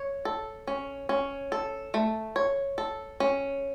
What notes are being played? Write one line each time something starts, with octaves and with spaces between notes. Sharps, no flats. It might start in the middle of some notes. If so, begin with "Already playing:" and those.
Already playing: C#5
A4
C#4
C#4
A4
A3
C#5
A4
C#4